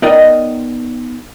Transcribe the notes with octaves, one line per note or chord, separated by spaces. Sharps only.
B3 D#4 A#4 D5 D#5 G5